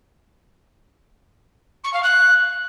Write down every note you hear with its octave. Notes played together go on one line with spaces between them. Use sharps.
C#6
F5
F#6